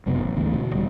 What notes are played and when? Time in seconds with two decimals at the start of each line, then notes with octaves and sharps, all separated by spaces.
0.06 F#1 F#2 C3 B3
0.22 A1
0.36 G#1 D2 E3
0.54 B2
0.73 E1 G3